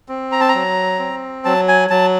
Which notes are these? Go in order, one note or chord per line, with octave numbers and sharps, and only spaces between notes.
C4
A#5
A5
A#5
F#3
C4
F#3 A5
G#5
F#3 A5